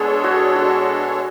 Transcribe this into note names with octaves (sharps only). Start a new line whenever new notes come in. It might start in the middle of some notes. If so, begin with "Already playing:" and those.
Already playing: B2 G#3 D4 G#4 A4 C#5
F#4
F#4